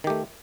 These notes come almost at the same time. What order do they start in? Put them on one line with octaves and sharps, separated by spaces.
D#3 G4 A3